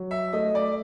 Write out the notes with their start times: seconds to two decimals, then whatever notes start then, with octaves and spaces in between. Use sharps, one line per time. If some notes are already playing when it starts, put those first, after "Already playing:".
Already playing: F#3
0.11 E5
0.33 A3 D#5
0.55 D5